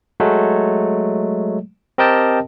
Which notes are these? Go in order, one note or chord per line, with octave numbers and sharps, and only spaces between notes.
F#3 G#3 A3
C4 G4 A#4 D#5 G5 A5